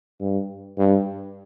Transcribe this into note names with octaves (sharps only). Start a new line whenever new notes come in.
G2
G2